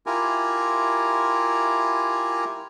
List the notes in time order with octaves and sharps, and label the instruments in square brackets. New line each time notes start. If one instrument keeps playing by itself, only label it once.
[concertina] E4 F4 G4 A#4 G#5